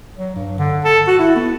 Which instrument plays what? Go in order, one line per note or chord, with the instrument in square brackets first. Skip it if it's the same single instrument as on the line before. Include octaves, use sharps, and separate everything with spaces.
[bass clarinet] F#3
G2
D3
A4
F#4
E4
B3